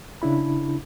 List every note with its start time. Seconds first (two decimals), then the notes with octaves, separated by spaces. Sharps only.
0.22 C#3 D4 E4 B5